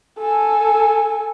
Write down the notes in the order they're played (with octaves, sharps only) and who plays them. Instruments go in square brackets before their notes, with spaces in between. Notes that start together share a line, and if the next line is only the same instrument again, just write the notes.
[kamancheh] A4 G#5